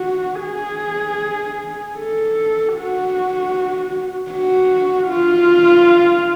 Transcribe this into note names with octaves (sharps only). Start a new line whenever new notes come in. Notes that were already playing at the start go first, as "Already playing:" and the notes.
Already playing: F#4
G#4
A4
F#4
F#4
F4